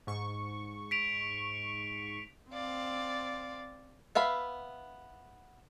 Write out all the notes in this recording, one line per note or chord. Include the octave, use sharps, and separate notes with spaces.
G#2 C#6
B6 D7 F7
C4 D5 F5
B3 E5 F5 B5